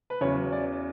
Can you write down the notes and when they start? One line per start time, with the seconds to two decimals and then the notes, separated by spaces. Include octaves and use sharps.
0.10 B4
0.21 E2 C#3 F#3 C#5
0.52 D5